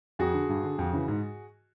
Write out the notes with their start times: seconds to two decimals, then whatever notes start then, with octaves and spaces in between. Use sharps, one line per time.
0.19 F2 F#4 G#4
0.34 D3
0.49 G2
0.64 D3
0.79 F2
0.93 C#3 E3
1.08 G#2